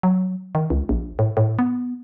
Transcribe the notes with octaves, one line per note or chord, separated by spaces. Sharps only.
F#3
D#3
C#2
A#1
A2
A2
B3